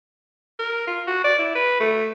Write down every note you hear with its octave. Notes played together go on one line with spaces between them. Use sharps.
A#4
F4
F#4
D5
E4
B4
A3